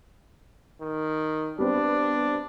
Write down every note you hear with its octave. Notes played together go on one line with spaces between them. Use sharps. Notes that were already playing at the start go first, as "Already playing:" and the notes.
D#3
G3 B3 C4 D4